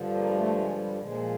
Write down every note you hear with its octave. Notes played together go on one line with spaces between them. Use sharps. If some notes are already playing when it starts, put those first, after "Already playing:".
Already playing: G2 D3 F3
A#3
G#3
A3
G#3
G3
A#2 F3 G#3